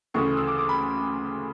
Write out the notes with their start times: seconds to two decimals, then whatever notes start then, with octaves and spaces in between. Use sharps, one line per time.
0.14 D2 C#3 E3 A3 C#6
0.37 E6
0.47 D6
0.58 D6
0.69 B5